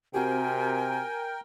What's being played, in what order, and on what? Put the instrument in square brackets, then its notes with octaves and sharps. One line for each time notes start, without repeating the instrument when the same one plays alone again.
[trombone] C3 [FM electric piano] C4 F#4 G4 [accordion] A#4 G5 [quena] G#5